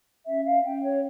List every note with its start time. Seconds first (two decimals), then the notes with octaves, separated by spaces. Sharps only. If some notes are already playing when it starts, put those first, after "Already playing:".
0.25 C#4 E5
0.45 F5
0.63 C#4 G5
0.82 C#5